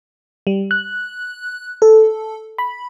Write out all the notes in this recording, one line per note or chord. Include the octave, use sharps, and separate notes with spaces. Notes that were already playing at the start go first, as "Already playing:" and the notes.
G3
F#6
A4
B5